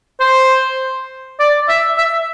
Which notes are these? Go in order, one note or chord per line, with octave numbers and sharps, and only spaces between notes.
C5
D5
E5
E5